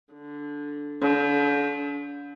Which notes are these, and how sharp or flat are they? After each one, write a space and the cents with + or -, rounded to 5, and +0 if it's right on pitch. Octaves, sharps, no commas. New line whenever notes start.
D3 -5
D3 -40